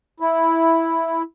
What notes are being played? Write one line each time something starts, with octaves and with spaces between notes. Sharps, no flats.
E4